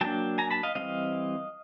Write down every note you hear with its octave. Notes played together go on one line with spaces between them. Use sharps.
F#3 A#3 D4 G5 A5
G#5 A#5
A5 B5
D#5 F5
E3 G3 C4 D#5 F5